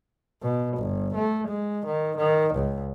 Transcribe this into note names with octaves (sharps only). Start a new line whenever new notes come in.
B2
G1
A3
G#3
D#3
D#3
C#2